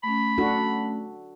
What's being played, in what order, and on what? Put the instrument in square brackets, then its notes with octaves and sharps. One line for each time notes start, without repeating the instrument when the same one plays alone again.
[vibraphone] A3 C#4 [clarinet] B5
[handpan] D4 F#4 A4